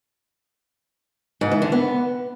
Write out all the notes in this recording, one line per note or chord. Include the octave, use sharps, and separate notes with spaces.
G#2
E3
D3
B3